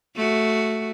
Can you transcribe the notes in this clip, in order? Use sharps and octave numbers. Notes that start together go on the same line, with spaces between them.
A3 F#4